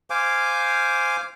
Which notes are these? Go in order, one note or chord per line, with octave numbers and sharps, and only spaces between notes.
C5 F5 G#5 D6